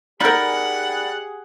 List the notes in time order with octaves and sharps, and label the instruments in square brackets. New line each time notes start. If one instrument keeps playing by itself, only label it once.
[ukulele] D#4 A#4 [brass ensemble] G4 G#4 [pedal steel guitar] D5 B5 [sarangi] F#5